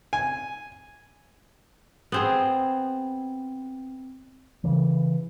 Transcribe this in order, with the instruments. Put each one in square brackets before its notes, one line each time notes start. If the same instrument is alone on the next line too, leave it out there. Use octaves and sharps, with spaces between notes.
[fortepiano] G#5
[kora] B3 C4 G#4
[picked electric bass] C#3 E3